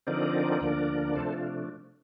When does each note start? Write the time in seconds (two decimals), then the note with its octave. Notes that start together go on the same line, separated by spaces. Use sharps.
0.07 D3 F3 C4 D#4 A#4 D5
0.61 D2 D3 F3 A#3 D4
1.15 C3 F3 A3 D4 A4 C5
1.33 F4